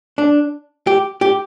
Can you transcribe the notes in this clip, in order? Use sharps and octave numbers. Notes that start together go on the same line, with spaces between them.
D4
G4
G4